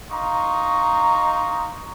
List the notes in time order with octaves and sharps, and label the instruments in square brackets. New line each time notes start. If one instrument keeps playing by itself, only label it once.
[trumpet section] D#4 F5 A#5 C6 C#6